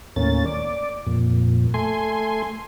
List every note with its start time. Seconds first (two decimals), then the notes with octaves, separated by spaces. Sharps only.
0.16 D#2 A2 A#3 C#4 A6
0.45 D5
1.07 F2 A#2
1.74 A3 G#5 C6